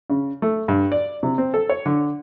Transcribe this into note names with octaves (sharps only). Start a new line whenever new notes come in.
C#3
A3
G2
D5
C3
C4
A4
C#5
D3